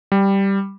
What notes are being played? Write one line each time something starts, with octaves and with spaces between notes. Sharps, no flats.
G3